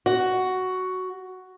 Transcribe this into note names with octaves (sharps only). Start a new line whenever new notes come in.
F#4